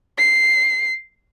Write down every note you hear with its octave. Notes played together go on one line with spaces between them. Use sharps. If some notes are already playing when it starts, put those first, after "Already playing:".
C7